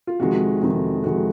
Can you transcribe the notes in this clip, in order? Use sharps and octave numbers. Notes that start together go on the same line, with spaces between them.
F4
F2 C3 D#3 G#3 F#4
F2 C3 D#3 G#3
F2 C3 D#3 G#3 F#4